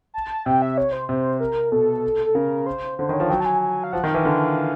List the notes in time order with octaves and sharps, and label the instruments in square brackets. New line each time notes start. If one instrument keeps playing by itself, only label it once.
[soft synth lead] A5
[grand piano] C3 [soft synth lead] G5
[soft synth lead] E5
C#5
C5
[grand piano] C3 [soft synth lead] C5
[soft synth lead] A#4
[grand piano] B2 [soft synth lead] A4
[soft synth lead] A4
[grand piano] C#3 [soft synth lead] A#4
[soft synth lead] C5
[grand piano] D3 [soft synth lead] C5
[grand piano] D#3
[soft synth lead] C#5
[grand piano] F3
[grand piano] F#3 [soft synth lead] G5
[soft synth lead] A5
G#5
G#5
F5
[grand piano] F3 [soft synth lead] F#5
[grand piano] D#3
[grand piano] E3 [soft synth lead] F5
[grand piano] D3